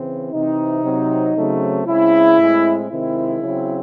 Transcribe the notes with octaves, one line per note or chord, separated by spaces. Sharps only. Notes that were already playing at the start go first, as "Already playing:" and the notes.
Already playing: C#3 E3 C4
C3 E3 C4 D#4
C3 F#3 C4
C#3 F#3 A3 C4
C#3 G#3 C4 E4
A2 G#3 C4
C3 D#3 G#3 C4 E4
C#3 F#3 C4